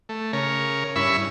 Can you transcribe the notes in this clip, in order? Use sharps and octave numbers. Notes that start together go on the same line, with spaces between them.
A3
C#3 A#4 C#5
G2 C#4 E4 B5 C#6 E6